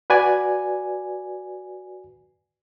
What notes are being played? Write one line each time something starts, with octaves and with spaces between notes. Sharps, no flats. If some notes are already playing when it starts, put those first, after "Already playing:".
F#4 B4 D5 G#5